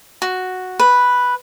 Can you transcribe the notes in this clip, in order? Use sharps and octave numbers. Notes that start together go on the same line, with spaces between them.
F#4
B4